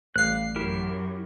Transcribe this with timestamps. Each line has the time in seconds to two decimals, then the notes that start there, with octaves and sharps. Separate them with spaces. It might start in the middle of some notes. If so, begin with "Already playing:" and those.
0.16 A1 G3 F5 F#6 C7
0.56 F#2 E4 G4 A#4